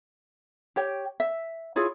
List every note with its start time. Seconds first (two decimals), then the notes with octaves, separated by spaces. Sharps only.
0.76 G4 C#5 G5
1.20 E5
1.76 E4 F4 G#4 C#5